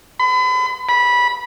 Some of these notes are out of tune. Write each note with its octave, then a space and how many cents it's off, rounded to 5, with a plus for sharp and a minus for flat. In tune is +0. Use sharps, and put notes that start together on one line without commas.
B5 +40
B5 -15